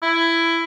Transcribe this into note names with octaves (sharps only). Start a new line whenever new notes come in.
E4